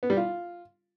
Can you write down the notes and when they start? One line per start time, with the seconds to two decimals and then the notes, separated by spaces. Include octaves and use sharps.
0.03 B3
0.10 G3
0.17 F4